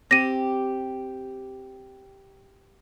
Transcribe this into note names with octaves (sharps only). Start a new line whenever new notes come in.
C4 G4 A#6 D#7